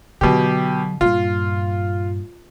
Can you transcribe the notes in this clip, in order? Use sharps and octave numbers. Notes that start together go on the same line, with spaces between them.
B2 D3 F#3 G4
G2 A#2 F4